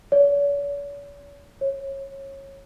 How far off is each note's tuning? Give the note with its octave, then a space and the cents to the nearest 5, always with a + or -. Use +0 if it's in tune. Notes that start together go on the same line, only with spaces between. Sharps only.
C#5 +45
C#5 -20